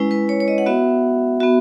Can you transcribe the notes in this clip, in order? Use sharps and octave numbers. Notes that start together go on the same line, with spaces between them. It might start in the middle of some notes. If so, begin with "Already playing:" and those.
Already playing: G#3 C#4 E4 B4
B4
C#5
C#5
D#5
F#5
B3 F#4 E5
B3 F#4 E5